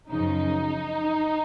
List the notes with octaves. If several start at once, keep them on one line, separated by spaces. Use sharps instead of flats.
F#2 C#3 F3 D#4